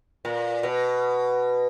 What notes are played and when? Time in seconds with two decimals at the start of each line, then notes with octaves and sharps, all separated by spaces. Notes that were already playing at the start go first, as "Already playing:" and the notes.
0.25 A#2
0.63 B2